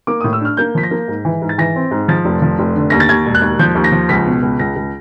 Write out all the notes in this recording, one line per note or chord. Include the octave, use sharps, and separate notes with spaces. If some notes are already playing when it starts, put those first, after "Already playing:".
A#3 D6
A2 D#6
E6
D4 F6
A#3 G6
F3 B6
A#6
A#3
G#2
E3
G#2
A6
E3 A#6
C4
G#2
F3 A6
F1
F3
F1
D3
D#2 A#6
A6
D#2 G#6
E1
F#6
D#2
F3 G6
D#2
A#6
F3
C#2 B6
B2
C#2
C#2 A#6
C#2